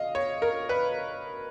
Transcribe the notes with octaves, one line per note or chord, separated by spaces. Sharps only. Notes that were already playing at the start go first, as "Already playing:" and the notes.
Already playing: D#5 F5
C#5
A#4
B4